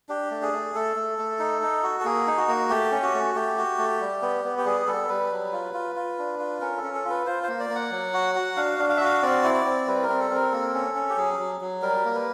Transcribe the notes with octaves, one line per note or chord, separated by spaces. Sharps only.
D4 G4
A3
G#4
A3
A3 A4
A3
A3
D#4
D#4
F#4
A4
A#3 G#4
D#4
F#4
A#3
A3 G4
C#4
F#4
A3
A3 G4
F#4
A3
G3
B3
B3
G4
G3 G#4
G3 A4
G3 B4
F#3
F4
F4
F4
D4
F4
C#4 A#4
A4
C#4
A4
F4 B4
F4 C5
C5
A#3
D5
A#3
F#5
F#3
F#4
F#4
D4 F5
D4
F5
E5
F#4 F5
C4 D5
E4
D5
C4
G3 B4
A#4
C4
A4
C4 A#4
A#3 A4
C#4
C#4
G4
F#3 G#4
F#3
F#3
G3 A#4
A#3
B4